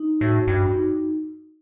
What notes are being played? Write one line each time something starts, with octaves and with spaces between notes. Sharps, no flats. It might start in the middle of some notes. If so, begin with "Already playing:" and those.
Already playing: D#4
A2 F#4
G2 F#4
D#4